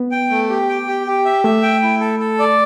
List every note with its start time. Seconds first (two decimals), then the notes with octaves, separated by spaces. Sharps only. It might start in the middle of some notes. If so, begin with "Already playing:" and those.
Already playing: B3
0.12 G5
0.30 A3
0.50 G4
0.69 G5
0.87 G4
1.07 G4
1.25 E5
1.44 A3 E5
1.63 G5
1.83 E4
2.00 A4
2.19 A4
2.39 D5